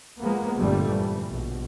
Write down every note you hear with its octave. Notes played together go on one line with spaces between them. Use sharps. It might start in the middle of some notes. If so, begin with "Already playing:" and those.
F3 G#3 A#3 B3
G1 F2 A#2 D3 G3 A3
E3
A#1 B2